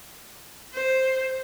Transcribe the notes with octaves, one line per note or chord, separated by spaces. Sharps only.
C5